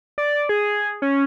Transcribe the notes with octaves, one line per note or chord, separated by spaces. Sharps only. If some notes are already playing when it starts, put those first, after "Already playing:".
D5
G#4
C#4